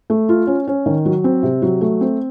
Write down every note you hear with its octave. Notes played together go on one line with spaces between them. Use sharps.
A3
F4
C#4
C#4
D#3
F#3
C4
C3
F#3
A3
C4